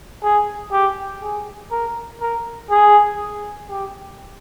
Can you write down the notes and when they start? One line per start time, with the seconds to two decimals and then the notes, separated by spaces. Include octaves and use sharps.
0.23 G#4
0.72 G4
1.23 G#4
1.71 A#4
2.21 A#4
2.70 G#4
3.70 G4